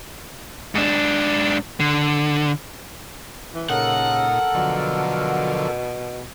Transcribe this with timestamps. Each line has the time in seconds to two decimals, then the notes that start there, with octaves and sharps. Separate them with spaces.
0.75 G#2 D4
1.80 D3
3.54 E3
3.70 A#2 C#3 D#4 A4 A#4 F#5
4.55 B2 D3 F3 F#3